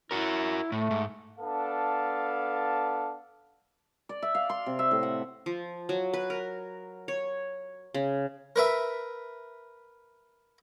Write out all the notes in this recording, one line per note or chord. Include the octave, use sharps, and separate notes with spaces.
E4 F#4 A#4
A2 A3
G#2
B3 D4 A4 F5
D5
E5
F5
C6
C3
E5
A2
F#5
F3
F#3
B4
A#4
C#5
C#3
A#4 B4 E5